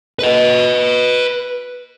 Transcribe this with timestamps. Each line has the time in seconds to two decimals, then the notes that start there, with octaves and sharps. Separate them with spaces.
0.19 B4 D#5